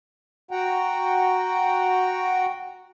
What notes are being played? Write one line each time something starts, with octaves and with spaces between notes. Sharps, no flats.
F#4 F#5 G5 A#5